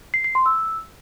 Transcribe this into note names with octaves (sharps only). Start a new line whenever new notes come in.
C7
C7
C6
E6